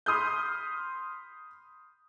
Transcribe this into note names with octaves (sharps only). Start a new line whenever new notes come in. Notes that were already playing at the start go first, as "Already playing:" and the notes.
B5 C6 D#6 F6 G6